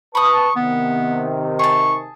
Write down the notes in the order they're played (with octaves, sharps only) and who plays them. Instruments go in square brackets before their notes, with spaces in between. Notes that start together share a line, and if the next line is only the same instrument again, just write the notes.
[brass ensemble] B4 A5 [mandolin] B5 D#6 [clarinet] C#6
[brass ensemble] C3 D#3 [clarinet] B3
[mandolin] G#4 A5 [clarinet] C#6